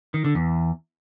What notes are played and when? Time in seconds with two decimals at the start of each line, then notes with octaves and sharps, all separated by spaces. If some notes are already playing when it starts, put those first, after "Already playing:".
0.14 D#3
0.25 D3
0.35 E2